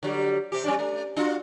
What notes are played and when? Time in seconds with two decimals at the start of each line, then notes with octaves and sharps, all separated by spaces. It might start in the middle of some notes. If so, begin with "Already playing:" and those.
0.03 D3 F#3 G3
0.52 C3 G4
0.64 G3 C#4 D4
0.79 A3
1.17 D4 F4 F#4